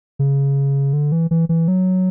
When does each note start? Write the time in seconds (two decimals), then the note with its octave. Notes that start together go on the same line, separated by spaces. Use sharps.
0.19 C#3
0.93 D3
1.12 E3
1.31 E3
1.49 E3
1.68 F#3